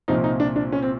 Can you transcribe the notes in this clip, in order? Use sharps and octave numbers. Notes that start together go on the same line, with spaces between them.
C2 A#2 F3 D#4
D#4
D4
D4
C#4
C4